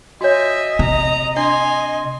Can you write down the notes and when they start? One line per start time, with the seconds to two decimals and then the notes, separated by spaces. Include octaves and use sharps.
0.21 F#4 C#5 D#5 E5 G#5
0.79 C3 A#5
1.36 D4 G#5 C6